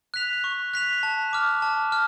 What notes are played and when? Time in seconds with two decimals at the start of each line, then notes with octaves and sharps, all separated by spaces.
0.14 F#6 B6 F7
0.44 C#6
0.74 F#6 B6 F7
1.03 A5
1.33 D6 F6
1.62 A5
1.92 F6